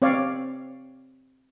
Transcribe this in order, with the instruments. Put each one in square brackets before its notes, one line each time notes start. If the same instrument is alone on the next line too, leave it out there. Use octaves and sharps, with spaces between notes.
[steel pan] C4 C#5 D5 F5